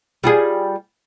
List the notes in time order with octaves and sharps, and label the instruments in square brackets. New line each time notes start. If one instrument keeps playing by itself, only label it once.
[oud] G3 F4 G#4